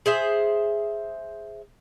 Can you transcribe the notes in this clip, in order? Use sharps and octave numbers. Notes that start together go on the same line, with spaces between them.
G#4 C5 E5